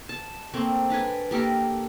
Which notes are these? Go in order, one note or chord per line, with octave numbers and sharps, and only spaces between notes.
A5
A3 A#3 C4
D4 B4 D5 G#5
A#3 G4 A4 A#4